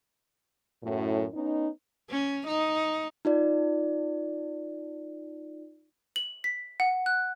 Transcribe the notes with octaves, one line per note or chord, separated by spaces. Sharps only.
F#2 A2
B3 C#4 D#4
C#4
D#4
D#4 F4 D5
F#7
B6
F#5
F#6